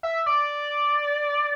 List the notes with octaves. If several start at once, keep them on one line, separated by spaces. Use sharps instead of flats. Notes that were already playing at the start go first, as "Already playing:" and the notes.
E5
D5